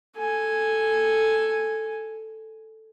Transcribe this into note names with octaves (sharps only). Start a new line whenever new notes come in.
A4 G#5